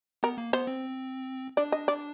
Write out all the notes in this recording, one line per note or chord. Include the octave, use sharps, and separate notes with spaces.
B3 A#4
A#3
B3 C5
C4
D4 D5
D#5
D5